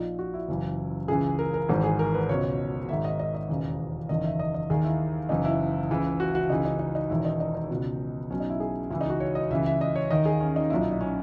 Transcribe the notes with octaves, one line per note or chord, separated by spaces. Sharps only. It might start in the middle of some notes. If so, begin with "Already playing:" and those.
Already playing: A#1 A#2 D#4
F#4
E4
F#1 F#2 E3
C#2 C#3 E3 G#4
A#4
A#4
G#1 G#2 E3
G#4
A#4
B4
C#2 B2 C#5
G#1 G#2 D#3 E5
D#5
D#5
D#5
E1 D#2 C#3 E3
F#1 E2 D#3 D#5
E5
D#5
D#5
D#2 D#3 G#4
E4
F#1 F#2 E3 D#4
E4
C#2 C#3 E3
F#4
F#4
C#2 C#3 E3 D#4
D#4
D#4
D#4
E1 E2 D#3 E4
D#4
D#4
D#4
C#2 B2
B1 B2 C#4
D#4
E4
G#4
C#2 C#3 E3 E4
D#4
F#4
C#5
D#5
C#2 C#3 E3 E5
E5
D#5
C#5
D#2 D#3 D#5
G#4
C#4
D#4
B1 A#2 E4
D#4
D#4
C#4